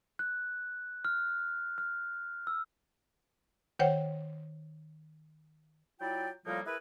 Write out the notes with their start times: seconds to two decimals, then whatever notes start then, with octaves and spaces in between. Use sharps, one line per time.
0.19 F#6
1.05 F6
1.78 F6
2.47 E6
3.79 D#3 C5 C#5 F#5 G5
6.00 F#3 E4 F4 D5 G5
6.45 A2 F3 G3 A#3 D#4 F4
6.66 E4 G#4 A#4 B4